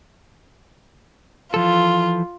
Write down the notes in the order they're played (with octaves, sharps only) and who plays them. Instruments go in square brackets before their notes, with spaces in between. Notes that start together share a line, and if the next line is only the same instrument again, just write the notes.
[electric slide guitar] E3 F3 A4 [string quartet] F4